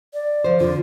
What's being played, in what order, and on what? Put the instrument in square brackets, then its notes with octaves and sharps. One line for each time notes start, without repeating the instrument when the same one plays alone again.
[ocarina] D5
[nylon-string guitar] F3 C5
[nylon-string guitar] F2 D3 [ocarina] F4